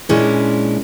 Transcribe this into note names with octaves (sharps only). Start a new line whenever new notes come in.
A#2 G#3 C#4 D4 E4